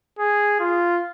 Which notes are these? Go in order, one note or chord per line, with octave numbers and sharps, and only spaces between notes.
G#4
F4